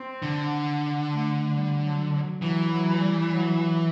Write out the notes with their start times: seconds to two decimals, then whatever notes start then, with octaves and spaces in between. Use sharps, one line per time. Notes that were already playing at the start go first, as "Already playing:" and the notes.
Already playing: C4
0.22 D3
1.10 A3
1.55 G3
1.84 F#3
2.13 F#3
2.42 E3 F#3
2.72 F#3
3.01 G3
3.31 F#3